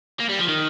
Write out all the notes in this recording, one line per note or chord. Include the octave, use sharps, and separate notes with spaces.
A#3
G3
F3
D#3